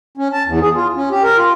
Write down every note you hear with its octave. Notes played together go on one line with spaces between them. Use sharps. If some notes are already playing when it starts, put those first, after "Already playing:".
C#4
A5
E2
G#4
F4
C#4
G4
A#4
F4